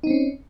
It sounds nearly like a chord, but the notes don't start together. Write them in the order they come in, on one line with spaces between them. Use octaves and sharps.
D#4 C4 C#4